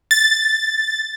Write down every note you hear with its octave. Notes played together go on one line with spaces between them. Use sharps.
A6